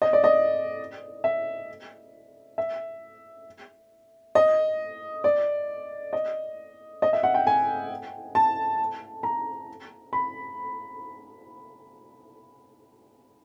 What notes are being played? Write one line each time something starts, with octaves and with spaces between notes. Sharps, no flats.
D#5
D5
D#5
E5
E5
D#5
D5
D#5
D#5
E5
F#5
G5
G#5
A5
A#5
B5